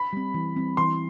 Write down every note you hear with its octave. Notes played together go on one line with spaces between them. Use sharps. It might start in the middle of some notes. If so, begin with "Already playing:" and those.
Already playing: B5
G3 C4
E3
G3 C4
E3 C6